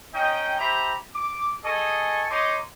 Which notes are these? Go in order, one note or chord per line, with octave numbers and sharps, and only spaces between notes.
C#4 D#4 D#5 G5
G4 C5 E5 A#5 B5
D6
G#4 A4 D#5 G#5 C#6
D#4 C#5 D#5 C6 D6